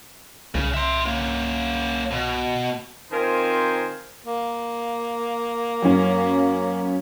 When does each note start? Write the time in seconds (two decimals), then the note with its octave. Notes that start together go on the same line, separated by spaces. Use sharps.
0.55 C2 C#3
0.74 E5 C6
1.06 A#3 C#4
2.11 B2
3.11 D#3 C4 F4 A#4 C5 G#5
4.26 A#3
5.82 F#2 C#4